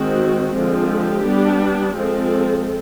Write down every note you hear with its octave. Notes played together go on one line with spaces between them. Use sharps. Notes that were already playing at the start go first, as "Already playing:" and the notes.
Already playing: D#3 G#3 C4 F#4
D3 F3 G#3 C4
G4
G3 B3 D4
F3 G#3 C4 A4